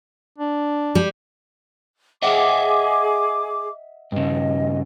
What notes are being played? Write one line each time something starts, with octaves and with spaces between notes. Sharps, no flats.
D4
G3
G#4 D#5 E5 F#5 D6
G2 C#3 D#5